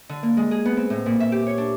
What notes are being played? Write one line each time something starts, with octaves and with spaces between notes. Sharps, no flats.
D3
A#3
G#3
G#4
B3
C4
A2
A#2
E5
G4
C#5
D4